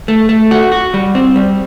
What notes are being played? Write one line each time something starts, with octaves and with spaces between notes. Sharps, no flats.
A3
A3
F#4
F#4
G3
C4
G3